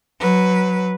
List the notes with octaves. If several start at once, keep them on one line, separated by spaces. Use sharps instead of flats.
F#3 B4